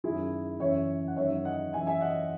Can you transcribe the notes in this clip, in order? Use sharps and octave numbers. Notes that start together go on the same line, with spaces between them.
F#2 D#3 F#3 E4 G#4
F#2 C#3 E3 C#5 E5
F#5
F#2 D#3 F#3 C#5 E5
D#5 F#5
F#2 E3 E5 G#5
E5 G#5
D#5 F#5